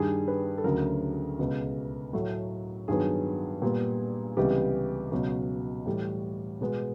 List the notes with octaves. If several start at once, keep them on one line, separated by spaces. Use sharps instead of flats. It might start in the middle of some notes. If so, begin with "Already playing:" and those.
Already playing: G2 D#3 G3 G#4
B4
A4
D2 C#3 F#3 A#4
C#2 B2 G#3 B3
A2 F#3 A3
G2 D#3 F#3 B3 G#4
A#2 G3 B3
C#2 C3 E3 G3 B3 G4
C#2 B2 F#3 F#4
A2 E3 G3
B2 G#3 B3